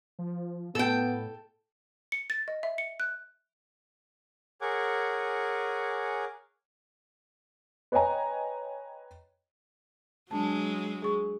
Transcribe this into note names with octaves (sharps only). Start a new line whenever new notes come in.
F3
A2 B3 A4 G5
C#7
A6
D#5
E5
C#7
F#6
G#4 A#4 C#5 F#5 G#5 D6
B4 C#5 D#5 G5 G#5 A#5
F#3 G#3 D4 A5
G#4 C#6